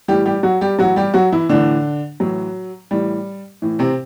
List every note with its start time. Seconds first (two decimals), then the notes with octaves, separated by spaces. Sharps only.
0.08 A2 E3 G3 G4
0.26 G3 G4
0.43 F#3 F#4
0.61 G3 G4
0.79 A2 E3 F#3 F#4
0.96 G3 G4
1.14 F#3 F#4
1.32 E3 E4
1.49 A2 D3 E3 D4
2.20 A2 E3 F#3
2.91 A2 E3 G3
3.62 A2 E3
3.79 C3 C4